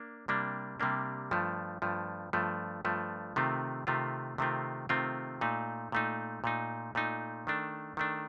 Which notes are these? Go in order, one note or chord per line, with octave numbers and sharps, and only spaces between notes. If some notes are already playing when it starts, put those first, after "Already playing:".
Already playing: A#3 D4
C3 G3 A#3 D4
C3 G3 A#3 D4
G2 F3 A3
G2 F3 A3
G2 F3 A3
G2 F3 A3
C3 D#3 A3 C4 F4
C3 D#3 A3 C4 F4
C3 D#3 A3 C4 F4
C3 D#3 A3 C4 F4
A#2 A3 D#4
A#2 A3 D#4
A#2 A3 D#4
A#2 A3 D#4
D#3 A3 D4
D#3 A3 D4